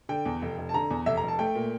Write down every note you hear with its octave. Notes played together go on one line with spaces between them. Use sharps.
D3 G5
E2
F1
F1
A5
D3 A#5
E2
F1 E5
A#5
F1
A5
A3 G5
A#2